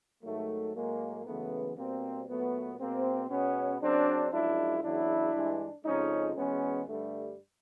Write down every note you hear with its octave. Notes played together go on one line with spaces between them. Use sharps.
G#2 D#3 F#3 A3
A2 F#3 G#3 A#3
F#2 C#3 E3 G#3 A3 B3
B2 G3 A#3 C4
A#2 F#3 A3 B3
B2 G#3 A#3 C4
B2 G#3 B3 C#4
F#2 C#3 F#3 C4 D4
F#2 C#3 F3 G#3 D4 E4
E2 C#3 F#3 D4 E4
G2 E3 G#3
F2 C#3 F3 G#3 C#4 D#4
E2 B2 G#3 B3 C#4
G2 D3 G3 A3